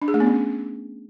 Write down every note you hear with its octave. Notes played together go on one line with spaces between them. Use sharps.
D4
G#4
A3
B3
C#4